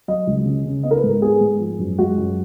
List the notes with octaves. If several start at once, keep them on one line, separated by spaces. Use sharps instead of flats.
F#3 D#5
C#2
C#3
C#3
B3 D#5
A#4
B4
G#2
A#4
B3 G#4
G#2
F3
F#2
G#3 F#4
F#2